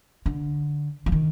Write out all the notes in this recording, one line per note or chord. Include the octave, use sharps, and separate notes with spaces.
D3
F3
D#3